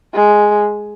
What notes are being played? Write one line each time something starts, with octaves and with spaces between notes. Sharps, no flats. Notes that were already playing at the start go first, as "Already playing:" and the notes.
G#3